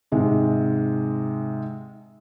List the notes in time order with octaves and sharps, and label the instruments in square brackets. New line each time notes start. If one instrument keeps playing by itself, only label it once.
[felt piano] G#2 C3 G#3 D#4